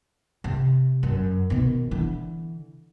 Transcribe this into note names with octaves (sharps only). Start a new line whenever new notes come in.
C3
F#2
B2 D#3
D3 E3